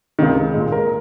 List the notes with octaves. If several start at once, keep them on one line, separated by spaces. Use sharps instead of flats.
C#2 C3 D#3
A#2 G#3
A#4